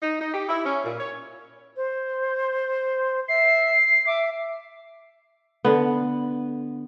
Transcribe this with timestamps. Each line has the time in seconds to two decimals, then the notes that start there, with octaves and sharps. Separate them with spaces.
0.02 D#4
0.20 D#4
0.33 G4
0.49 E4
0.65 C#4
0.84 A#2
0.99 C#5
1.77 C5
3.28 E5 C7
4.07 E5 D6
5.65 D3 B3